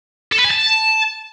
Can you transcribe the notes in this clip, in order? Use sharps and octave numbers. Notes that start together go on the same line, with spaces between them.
A4
B4
G#5
A5